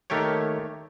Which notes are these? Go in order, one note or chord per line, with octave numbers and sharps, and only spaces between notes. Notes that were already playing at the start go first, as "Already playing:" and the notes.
D#3 A3 A#3 G4 C#5